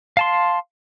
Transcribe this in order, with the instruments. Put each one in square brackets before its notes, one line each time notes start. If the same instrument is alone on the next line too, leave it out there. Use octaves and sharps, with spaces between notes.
[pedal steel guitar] F5 A5 C6